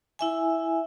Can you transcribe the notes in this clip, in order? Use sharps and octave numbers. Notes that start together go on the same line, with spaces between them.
E4 E5 G#5